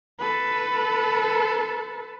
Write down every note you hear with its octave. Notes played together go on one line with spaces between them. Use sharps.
A4 B4